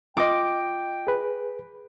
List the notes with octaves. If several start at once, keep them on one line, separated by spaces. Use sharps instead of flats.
F4 D#5 G5 D6
G#4 B4